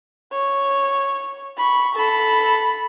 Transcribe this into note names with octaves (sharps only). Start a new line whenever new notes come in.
C#5
B5 C#6
A4 B5